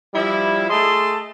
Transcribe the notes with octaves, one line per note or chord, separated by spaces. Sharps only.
F3 G3 E4
A3 G#4 D#5 A5 C6